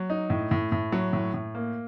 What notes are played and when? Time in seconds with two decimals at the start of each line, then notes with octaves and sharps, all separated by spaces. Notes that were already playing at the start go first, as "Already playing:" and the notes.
Already playing: F#3
0.10 D#4
0.30 A2
0.51 A2
0.72 A2
0.92 F#3
1.13 A2
1.34 A2
1.55 A#3